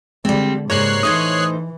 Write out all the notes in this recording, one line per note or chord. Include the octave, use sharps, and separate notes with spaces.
D3 G3 G#3 C4
G#2 C#3 G3 A#3 C#5 F#6 C7
A2 E3 D#4 C5 D#6 G#6